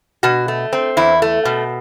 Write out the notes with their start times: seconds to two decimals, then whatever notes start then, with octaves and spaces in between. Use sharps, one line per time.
0.23 B2 F#4
0.48 A3
0.73 C4
0.97 E2 E4
1.22 A3
1.45 B2